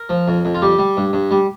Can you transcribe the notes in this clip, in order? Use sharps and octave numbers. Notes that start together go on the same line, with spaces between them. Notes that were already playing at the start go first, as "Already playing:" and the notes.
Already playing: A#4
F3
F2
F2
F4
G3 G4
G3
G2
G2
G3